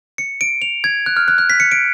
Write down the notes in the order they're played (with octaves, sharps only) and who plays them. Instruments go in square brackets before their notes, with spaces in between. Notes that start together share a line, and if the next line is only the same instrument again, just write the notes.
[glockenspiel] C#7
D7
F7
G#6
F#6
F6
F#6
F#6
B6
C#7
D7